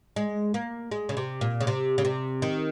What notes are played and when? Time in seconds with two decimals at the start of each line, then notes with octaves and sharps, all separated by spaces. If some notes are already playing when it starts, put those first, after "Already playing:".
0.16 G#3
0.54 A#3
0.92 G#3
1.09 C#3
1.17 C3
1.41 A#2
1.61 C#3
1.67 C3
1.98 C#3
2.05 C3
2.42 D#3